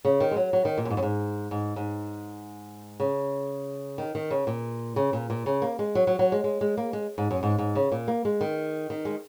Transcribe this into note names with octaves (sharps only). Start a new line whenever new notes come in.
C#3
D#3
G#3
F#3
F#3
D#3
A#2
F#2
G#2
F#2
G#2
G#2
G#2
C#3
D#3
D#3
C#3
A#2
C#3
A#2
A#2
C#3
A#3
G#3
F#3
F#3
F#3
G#3
G#3
G#3
A#3
G#3
G#2
F#2
G#2
G#2
C#3
A#2
A#3
G#3
D#3
D#3
G#3